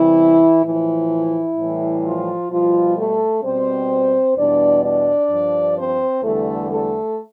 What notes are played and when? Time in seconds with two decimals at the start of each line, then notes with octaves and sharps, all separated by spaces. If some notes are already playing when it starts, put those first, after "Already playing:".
Already playing: E2 C3 E3 G3 E4
0.64 A2 E3 F3 E4
1.57 A2 E3 G3
2.04 F3 F4
2.51 B2 F3 G3 F4
2.97 A3 A4
3.43 B2 G3 C4 C5
4.37 E2 B2 G3 D4 D5
4.83 D4 D5
5.30 G2 F3
5.77 C4 C5
6.23 E2 D3 G3 A3 A4
6.70 A3 A4